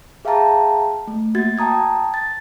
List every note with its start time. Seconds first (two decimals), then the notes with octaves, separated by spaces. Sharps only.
0.25 G#4 E5 F5 G5 A5 A#5
1.07 A3
1.35 A#3 F#4 G#6 A6
1.58 G5 A5 A#5 D#6 G#6
2.14 A6